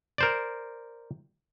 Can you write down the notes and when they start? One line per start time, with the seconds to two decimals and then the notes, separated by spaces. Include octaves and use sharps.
0.18 A#4 C5 D5